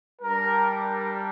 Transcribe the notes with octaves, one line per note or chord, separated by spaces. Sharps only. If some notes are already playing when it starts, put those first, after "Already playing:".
G3 D4 G4 A#4
A#4